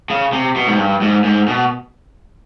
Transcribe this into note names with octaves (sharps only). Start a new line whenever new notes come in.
C#3
C3
B2
G#2
G2
G#2
G#2
B2